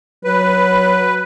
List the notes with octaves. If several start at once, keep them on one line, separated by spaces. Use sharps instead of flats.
F#3 B4